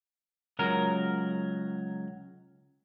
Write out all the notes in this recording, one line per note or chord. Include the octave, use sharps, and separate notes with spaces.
C#2 F#3 A#4